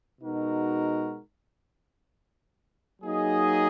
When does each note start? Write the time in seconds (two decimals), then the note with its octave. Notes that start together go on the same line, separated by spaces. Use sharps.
0.21 B2 G#3 D#4 F#4 A#4
3.01 F#3 A#3 D#4 G#4 D#5